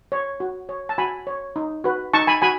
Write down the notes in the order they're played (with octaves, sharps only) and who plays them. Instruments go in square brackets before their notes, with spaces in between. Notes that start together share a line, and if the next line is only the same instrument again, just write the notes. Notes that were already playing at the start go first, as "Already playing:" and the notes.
[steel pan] C#5
F#4
C#5
A5
F#4 G#5 B5
C#5
D#4
F#4 B4
D#4 A5 C#6
G#5 B5
F#4 G#5 B5